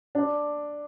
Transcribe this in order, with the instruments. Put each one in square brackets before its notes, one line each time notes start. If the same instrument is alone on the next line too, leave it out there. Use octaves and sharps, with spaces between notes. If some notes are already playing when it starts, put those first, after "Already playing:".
[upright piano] D4